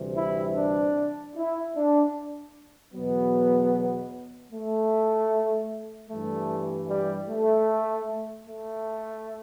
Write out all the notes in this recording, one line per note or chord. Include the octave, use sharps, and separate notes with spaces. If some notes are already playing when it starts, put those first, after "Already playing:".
Already playing: D2 C3 E3 G3
E4
D4
E4
D4
E2 B2 F#3 B3
A3
G2 E3 G3 A3
G3
A3
A3